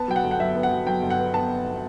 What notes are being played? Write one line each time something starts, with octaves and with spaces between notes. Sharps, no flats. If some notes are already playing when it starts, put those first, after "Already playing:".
Already playing: B3 A5
F#3 G5
F#5
G1
F#5
F#3 E5
B3
F#5
F#3
F#3 G5
G1
F#5
B3
B3 A5